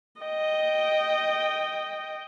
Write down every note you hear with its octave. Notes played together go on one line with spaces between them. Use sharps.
D#5 G5